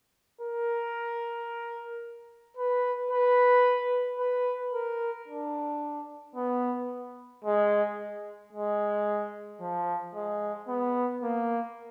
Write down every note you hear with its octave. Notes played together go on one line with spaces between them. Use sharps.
A#4
B4
B4
B4
A#4
D4
B3
G#3
G#3
F3
G#3
B3
A#3